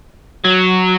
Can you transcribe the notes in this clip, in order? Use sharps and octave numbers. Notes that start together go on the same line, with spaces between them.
F#3